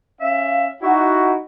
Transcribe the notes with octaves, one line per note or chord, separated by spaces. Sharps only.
C#4 E5 F5
D#4 E4 F#4